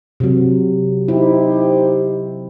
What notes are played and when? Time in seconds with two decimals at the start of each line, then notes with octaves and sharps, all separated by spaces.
0.20 C3 F#3
1.08 D#4 E4 G4 C5